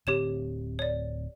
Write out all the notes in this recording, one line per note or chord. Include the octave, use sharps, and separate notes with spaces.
D1 D2 C4 G4 C#5 E7
C#5 D5